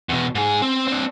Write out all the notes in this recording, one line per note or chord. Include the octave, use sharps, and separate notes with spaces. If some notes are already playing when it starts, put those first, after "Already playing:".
E2 B2
G#2 G#4
C4
C4 D4